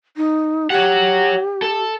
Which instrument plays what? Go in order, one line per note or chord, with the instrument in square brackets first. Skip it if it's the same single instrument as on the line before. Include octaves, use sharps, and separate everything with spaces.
[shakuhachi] D#4
[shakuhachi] G4 [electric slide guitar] C#5 F#5
[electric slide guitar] A4